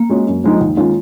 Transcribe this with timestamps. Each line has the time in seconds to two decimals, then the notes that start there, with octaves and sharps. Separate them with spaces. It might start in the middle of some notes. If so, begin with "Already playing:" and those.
Already playing: A#3
0.10 G#3 C#4 F#4
0.27 F#2
0.44 F3 G#3 D#4
0.61 D#2
0.77 D#3 G#3 C#4 F4